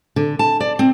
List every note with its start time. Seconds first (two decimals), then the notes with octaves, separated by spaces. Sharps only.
0.16 D3
0.39 A5
0.60 D5
0.79 C4